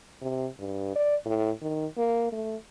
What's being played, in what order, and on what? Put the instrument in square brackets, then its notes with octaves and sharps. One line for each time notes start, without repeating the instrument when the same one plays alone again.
[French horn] C3
G2
D5
A2
D#3
A#3
A3